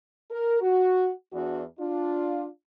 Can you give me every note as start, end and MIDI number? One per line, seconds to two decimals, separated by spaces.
0.31 0.58 70
0.61 1.10 66
1.32 1.62 40
1.32 1.62 62
1.32 1.62 66
1.79 2.46 62
1.79 2.46 65